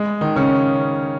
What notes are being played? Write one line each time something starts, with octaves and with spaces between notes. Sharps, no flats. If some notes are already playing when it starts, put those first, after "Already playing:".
Already playing: G#3
D#3 D#4
C#3 C#4